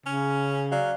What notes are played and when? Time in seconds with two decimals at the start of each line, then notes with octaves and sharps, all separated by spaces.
0.06 C#3 C#4
0.72 F#3 D5 F5